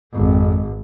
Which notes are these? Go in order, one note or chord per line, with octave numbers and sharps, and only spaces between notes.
G#1 F2